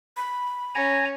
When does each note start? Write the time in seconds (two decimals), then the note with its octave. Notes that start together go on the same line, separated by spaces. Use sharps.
0.17 B5
0.75 C#4 G#5 A#5